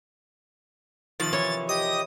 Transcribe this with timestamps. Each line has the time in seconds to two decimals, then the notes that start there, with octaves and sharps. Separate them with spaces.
1.20 C3 D#3 F3 A6
1.33 E3 C#5
1.69 G4 D#5 D#6